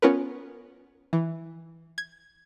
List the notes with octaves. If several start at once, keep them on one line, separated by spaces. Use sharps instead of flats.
B3 C#4 F4 A#4 B4
E3
G#6